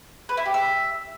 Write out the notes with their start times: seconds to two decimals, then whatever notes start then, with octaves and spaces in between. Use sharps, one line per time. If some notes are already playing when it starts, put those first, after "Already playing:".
0.29 B4
0.37 E4
0.46 G4
0.54 E5